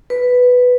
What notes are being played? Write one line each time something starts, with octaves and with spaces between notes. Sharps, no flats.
B4